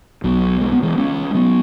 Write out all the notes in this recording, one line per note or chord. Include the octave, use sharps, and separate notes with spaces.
B1 B2 F#3
G#3
B3
E3 G#3
G#3 C#4
F#3 B3